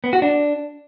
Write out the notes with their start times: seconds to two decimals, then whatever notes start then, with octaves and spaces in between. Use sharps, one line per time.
0.04 B3
0.13 F#4
0.22 D4